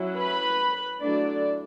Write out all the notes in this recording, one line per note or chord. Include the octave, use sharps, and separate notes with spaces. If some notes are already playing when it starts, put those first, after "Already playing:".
Already playing: F#3 C#4 E4
B4 B5
D3 F#3 A3 D4 E4 D5